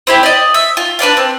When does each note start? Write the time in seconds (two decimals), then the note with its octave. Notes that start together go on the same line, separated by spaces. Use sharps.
0.07 C4 E4 G4
0.23 D5 D#5
0.54 E5
0.77 F4
0.99 D4 B4 D5 F5
1.17 C4